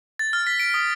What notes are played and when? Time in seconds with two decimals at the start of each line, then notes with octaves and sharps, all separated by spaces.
0.19 A6
0.33 F6
0.47 B6
0.60 D7
0.74 D#6